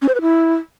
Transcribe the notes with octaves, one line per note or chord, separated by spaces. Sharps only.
C#4
C5
B4
E4